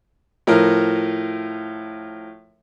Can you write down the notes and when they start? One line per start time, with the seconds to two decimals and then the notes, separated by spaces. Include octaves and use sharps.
0.47 A2 F3 A#4